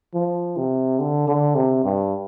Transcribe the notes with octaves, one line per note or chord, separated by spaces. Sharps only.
F3
C3
D3
D3
C3
G2